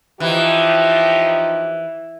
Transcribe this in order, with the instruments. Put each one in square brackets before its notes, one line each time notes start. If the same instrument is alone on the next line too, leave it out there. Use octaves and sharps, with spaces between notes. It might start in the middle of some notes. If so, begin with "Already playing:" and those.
[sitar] E3 [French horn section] F3 D#4 G4